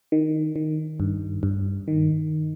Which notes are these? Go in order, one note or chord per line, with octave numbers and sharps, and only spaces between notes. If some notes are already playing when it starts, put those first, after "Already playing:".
D#3
D#3
G2
G2
D#3